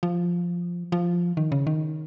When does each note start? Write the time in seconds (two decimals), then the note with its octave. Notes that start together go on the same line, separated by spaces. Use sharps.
0.03 F3
0.92 F3
1.37 D#3
1.52 C#3
1.67 D#3